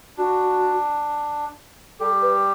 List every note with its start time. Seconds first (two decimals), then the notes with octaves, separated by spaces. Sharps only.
0.17 D4 F#4
2.00 G3 G4 A4
2.22 B4